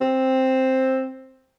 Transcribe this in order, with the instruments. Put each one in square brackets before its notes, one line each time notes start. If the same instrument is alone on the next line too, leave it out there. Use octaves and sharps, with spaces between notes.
[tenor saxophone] C4